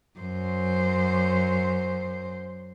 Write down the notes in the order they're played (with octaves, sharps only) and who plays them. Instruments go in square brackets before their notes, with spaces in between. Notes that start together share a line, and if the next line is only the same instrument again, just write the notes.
[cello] F#2 C5